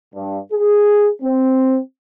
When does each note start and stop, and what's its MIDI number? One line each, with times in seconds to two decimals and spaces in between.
0.15 0.38 43
0.52 1.09 68
1.23 1.79 60